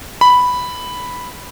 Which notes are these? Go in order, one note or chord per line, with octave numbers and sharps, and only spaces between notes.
B5